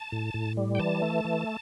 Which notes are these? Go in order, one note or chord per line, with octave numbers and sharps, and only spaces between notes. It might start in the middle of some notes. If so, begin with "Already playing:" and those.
Already playing: A5
A2
A2
G3
G5
E3 A5
A3
E3